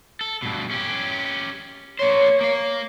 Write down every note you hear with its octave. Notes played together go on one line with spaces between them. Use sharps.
A4
G2 B2
C#4 G4
A#3 C5 C#5
A#3 F5